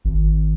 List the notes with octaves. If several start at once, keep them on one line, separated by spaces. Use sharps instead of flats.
G#1